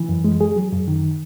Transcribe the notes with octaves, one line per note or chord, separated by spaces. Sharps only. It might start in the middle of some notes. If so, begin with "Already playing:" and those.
Already playing: E3
F#2
G#3
G#4
F#3
F#2
D#3